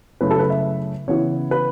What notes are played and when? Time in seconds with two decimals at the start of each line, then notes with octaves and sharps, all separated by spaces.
0.21 F#2 C#3 A3 C#4 E4 B4
0.31 A4
0.39 B4
0.50 E5
1.08 C#3 E3 B3 E4 C#5
1.51 B4